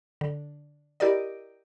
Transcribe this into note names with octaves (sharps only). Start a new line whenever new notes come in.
D3
E4 G4 A#4 D5 D#5